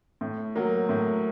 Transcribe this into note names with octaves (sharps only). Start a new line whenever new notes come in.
A2
F#3 A#3
A2